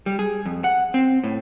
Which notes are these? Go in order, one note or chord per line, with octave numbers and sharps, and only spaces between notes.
G3
G#4
F2
F#5
C4
A2